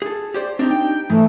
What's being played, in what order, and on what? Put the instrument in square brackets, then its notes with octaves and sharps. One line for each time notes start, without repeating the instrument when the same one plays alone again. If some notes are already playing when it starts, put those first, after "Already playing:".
[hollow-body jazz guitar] G#4 A4
G4 C5 D5
[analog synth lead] C4 [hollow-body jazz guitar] D4 D#4 G4
[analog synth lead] G5
[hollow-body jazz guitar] G#2 [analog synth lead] E3 [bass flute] A3